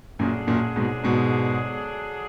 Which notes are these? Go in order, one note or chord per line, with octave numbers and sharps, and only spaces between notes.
F#2 A#2 D3 F#3 D4 G#4
F#2 A#2
G#2 B2
G#2 B2